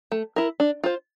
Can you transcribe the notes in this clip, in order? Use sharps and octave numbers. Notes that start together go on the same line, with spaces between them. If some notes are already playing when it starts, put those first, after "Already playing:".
A3
E4 A#4
D4
F4 C5